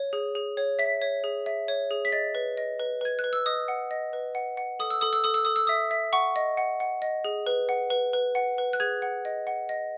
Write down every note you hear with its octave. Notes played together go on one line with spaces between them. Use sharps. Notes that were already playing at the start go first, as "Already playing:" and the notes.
Already playing: C#5
G#4
G#4
C#5
E5 B6
C#5
G#4
E5
C#5
G#4
B6
D#5 A6
B4
D#5
B4
B4 G#6
F#6
B4
E6
D#5 D#6
F#5
D#5
B4
F#5
F#5
A4 D#6
E6
A4 D#6
E6
A4 D#6
E6
A4 D#6
E6
E5 D#6
E5
F#5 C#6
D#5
F#5
F#5
D#5
G#4
B4
F#5
B4
B4
F#5
B4
F#6
G#4 G#6
F#5
D#5
F#5
D#5